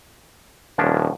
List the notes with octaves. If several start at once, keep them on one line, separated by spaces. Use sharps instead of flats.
D#1 F3 C#4 D4